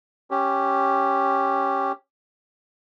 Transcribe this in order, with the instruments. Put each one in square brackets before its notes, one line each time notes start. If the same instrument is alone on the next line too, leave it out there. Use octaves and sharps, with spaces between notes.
[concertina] C#4 G4